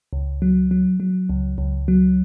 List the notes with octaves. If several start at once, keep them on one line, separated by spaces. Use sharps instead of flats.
C#2
F#3
F#3
F#3
C#2
C#2
F#3